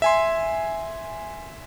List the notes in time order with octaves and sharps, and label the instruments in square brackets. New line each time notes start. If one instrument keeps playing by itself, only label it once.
[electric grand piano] E5 G#5 C6